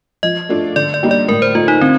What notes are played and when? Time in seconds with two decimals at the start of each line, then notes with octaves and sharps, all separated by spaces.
0.23 F3 D#5
0.49 A3 D4 F4 A4
0.76 D3 D5
0.94 D5
1.03 G3 A#3 D#4 G4
1.11 D5
1.28 A2 A#4
1.42 C5
1.55 A3 D#4 F4
1.68 D#4
1.81 D3 C4